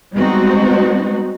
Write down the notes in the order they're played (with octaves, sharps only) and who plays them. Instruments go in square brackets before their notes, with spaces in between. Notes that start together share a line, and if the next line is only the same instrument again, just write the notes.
[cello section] G3 G#3 B3 C4 D#4 F#4